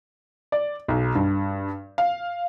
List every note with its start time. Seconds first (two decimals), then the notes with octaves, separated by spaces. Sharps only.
0.52 D5
0.88 B1
1.15 G2
1.98 F5